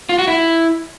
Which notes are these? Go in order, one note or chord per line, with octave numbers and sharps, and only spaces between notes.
F4
F#4
E4